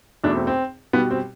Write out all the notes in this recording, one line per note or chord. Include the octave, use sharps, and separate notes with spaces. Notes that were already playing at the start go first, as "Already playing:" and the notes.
E2 B2 A3 D4
C4
C4
B2 G3 B3
C4